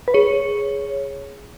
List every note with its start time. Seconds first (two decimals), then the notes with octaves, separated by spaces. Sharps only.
0.08 B4
0.14 G#4 C#5